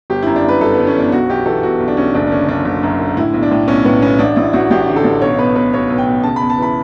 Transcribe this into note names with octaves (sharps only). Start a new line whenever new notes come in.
G1 G4
F#2 E4
D4
G1 B4
G1 A4
G1 B3
C#4
E3 D4
B1 F#4
B1 G4
E3 A4
B1 F#4
B1
D4
B1 C#4
F#1 D4
D4
D3 C#4
F#1 D4
F#1
F#2
D3
A2 E4
B1
D4
A2
B1 C#4
A2 B3
B1 C#4
A1 D4
A1 E4
A1 F#4
A1 G4
D3
A4
A1
B1 C#5
B2 B4
B1 B4
B1 C#5
B1
G5
B2
C#3 A5
E2 B5
A5
E3 B5